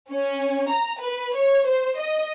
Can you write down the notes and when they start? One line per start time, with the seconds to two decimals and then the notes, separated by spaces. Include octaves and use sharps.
0.11 C#4
0.70 A#5
1.01 B4
1.36 C#5
1.67 C5
1.99 D#5